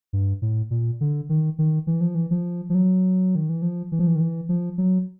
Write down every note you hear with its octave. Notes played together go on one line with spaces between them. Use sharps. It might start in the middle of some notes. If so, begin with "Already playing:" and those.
G2
A2
A#2
D3
D#3
D#3
E3
F3
E3
F3
F3
F#3
D#3
E3
F3
E3
F3
E3
D#3
E3
F3
F#3